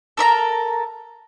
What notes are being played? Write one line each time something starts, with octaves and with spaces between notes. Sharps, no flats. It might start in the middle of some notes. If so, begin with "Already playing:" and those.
A4 A#4 E5 A#5